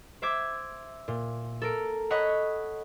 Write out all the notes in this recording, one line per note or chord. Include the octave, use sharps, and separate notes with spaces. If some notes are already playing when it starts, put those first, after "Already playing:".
C5 E5 D6 G#6
A#2
A4 A#4 D7
C#5 D#5 F#5 B5 C#6